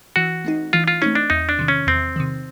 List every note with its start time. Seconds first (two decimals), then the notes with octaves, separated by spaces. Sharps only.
0.16 E3 F#4
0.44 A3 C4 D#4
0.73 E3 F4
0.88 F4
1.02 A3 C4 C#4 D#4
1.15 D4
1.30 E2 D#4
1.49 D4
1.59 C3 D#3
1.68 C#4
1.87 E2 C4
2.16 C3 D#3